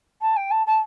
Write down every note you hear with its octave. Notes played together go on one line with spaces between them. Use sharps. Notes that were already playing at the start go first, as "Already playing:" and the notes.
A5
G5
A5
A5